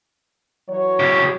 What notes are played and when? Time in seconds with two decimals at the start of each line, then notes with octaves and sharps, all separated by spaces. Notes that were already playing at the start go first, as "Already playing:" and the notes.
0.69 E3 F#3 C#5
1.00 C#3 G4